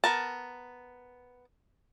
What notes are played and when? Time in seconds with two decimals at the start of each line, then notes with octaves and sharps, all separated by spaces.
0.04 B3 A#4 A5